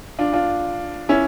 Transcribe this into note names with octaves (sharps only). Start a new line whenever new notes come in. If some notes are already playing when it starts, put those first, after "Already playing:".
D4 F4
D4 F4
C#4 E4